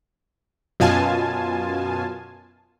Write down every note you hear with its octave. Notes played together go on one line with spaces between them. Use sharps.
F#2 B2 F4 G#5 A5